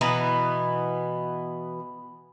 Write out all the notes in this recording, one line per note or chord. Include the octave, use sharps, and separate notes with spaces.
B2 E3 B3 A#5